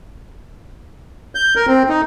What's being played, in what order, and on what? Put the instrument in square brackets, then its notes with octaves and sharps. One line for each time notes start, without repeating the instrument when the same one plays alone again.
[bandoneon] G6
A#4
C4
D#4